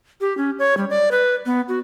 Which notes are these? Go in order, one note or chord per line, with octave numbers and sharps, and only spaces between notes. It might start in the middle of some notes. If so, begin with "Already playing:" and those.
G4
C#4
C#5
G3
D5
B4
B3
F#4